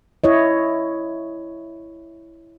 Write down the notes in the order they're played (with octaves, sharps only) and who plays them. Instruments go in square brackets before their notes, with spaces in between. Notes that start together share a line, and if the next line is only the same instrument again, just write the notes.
[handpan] E4 C#5 D#5